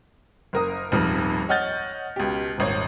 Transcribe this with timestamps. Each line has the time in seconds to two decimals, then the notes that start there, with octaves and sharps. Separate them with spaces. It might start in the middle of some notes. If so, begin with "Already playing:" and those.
0.53 F#1 A#4 D#6
0.92 D#1 F2 G#2 F6
1.49 C#5 D#5 F#5 F6 G6 A6
2.16 C#2 B2 G4
2.58 D#1 G#1 C#5